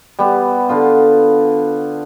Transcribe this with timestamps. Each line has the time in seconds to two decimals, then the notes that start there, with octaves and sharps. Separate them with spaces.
0.19 G3 B3
0.69 D3 B3 F4